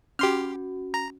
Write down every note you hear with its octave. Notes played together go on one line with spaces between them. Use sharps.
C#4 F#4 G4 C6 F6
A#5